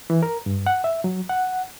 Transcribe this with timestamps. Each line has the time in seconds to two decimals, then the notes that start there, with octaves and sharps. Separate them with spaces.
0.10 E3
0.23 A#4
0.46 G2
0.66 F#5
0.84 E5
1.04 F#3
1.29 F#5